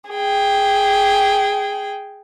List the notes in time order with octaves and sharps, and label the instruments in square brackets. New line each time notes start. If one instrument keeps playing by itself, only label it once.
[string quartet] G#4 G5